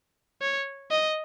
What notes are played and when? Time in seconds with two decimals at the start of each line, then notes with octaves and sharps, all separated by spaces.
0.41 C#5
0.91 D#5